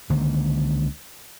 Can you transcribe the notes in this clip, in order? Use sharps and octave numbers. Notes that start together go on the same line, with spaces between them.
C#2 D3 D#3 A#3